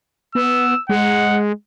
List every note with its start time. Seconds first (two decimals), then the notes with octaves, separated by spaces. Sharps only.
0.35 B3 E6
0.89 G#3 F#5